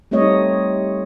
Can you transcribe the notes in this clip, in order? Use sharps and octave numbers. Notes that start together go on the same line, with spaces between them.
G3 A3 C4 D#4 C#5 D#5